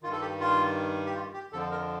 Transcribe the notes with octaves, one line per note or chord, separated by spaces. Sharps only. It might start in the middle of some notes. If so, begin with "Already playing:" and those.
G2 D#3 F4
A4
G4
F4
G4
F4
G4
F2 D3 F3 A4
A#4